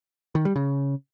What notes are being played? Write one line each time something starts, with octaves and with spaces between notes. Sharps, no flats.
D#3
G3
C#3